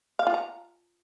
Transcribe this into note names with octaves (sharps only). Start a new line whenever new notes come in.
F5
F4
A#5